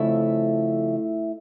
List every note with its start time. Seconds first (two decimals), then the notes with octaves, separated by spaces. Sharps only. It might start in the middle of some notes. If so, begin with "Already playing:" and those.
Already playing: F2 C#3 F3 A3 E4 E5